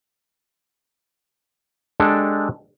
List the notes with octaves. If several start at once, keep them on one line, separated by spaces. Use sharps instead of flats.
G#3 D4 G4 A4